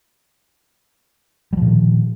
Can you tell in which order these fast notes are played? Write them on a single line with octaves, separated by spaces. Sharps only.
G3 F3 A#2 D#3